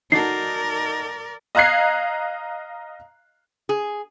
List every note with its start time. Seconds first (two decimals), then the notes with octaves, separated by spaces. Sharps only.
0.12 D#4 F#4 A4 A#4 D5 C7
1.55 D#5 F5 A#5 F#6 G#6 C7
3.69 G#4